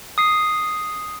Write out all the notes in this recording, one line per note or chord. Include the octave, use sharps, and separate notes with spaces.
D#6 C7